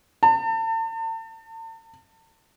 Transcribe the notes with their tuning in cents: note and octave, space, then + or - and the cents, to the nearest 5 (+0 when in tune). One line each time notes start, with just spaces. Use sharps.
A5 +40